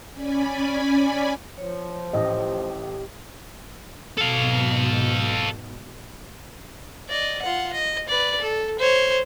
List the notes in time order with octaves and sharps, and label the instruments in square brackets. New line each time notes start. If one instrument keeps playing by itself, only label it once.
[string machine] C#4 D5 G#5 B5
[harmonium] F3 [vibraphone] C#5
[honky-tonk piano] A1 A2 [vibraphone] G4 [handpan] D#5
[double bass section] G#2 B2 [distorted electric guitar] A4 F5
[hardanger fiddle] D5 D#5
F4 F#5
D#5
B4 D5
A4
C5 C#5